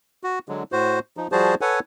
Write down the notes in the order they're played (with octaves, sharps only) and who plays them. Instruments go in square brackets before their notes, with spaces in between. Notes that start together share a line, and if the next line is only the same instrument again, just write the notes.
[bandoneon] F#4
D3 F#3 G#3
A2 F#4 C5
F3 D#4
F3 G3 F#4 G#4 C5 A5
A4 B4 C#5 F#5 G#5